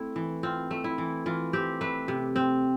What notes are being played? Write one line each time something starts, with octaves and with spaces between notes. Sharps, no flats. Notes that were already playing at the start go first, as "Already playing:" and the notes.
Already playing: A3 C4 E4
E3
C4 F4
A3
E4
E3
E3 F4
C4 G4
A3 B4
C3
C4